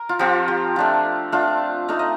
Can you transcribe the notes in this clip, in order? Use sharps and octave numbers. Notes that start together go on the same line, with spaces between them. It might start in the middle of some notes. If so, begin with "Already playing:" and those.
Already playing: A#4
F4
F3 C4 F4 G4
G4
A3 D4 F4
A3 D4 F4
A3 D#4 F5
D#5